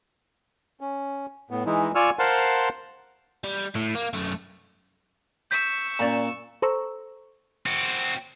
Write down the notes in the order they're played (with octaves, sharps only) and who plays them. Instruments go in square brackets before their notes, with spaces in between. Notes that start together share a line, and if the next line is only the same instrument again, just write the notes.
[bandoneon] C#4
A2 B3
E3 G#3 D#4 E4
F4 D5 G#5 C#6 E6 F6
A#4 C5 F5 F#5 A5 C6
[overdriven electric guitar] G3
A2
A#3
F#2 A3
[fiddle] C#6 E6 [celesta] G6 B6
[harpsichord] A#2 [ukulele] C#4 D5 A#5
[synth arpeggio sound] A4 C5 A#5 C#6 E6
[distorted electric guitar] C4 F#4